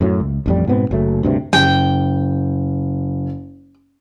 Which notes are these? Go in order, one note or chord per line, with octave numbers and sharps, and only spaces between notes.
F#2 A2 F#3
C#2
A1 F2 G3
G#2 B2 B3 C4
F#1 F#3 A3
D2 G2 C3
F#1 G5